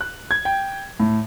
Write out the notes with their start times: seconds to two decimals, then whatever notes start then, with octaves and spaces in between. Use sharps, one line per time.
0.01 F#6
0.31 G#6
0.45 G5
1.00 A2